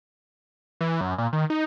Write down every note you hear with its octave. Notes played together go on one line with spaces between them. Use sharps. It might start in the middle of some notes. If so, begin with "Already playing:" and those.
E3
F#2
A#2
D#3
D#4